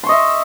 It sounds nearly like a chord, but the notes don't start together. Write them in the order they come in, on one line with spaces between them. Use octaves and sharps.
C6 C#6 D#5 E5